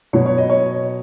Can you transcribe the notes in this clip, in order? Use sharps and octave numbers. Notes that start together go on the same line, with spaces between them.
B2 F#3 C#5
C#5
D#5
C#5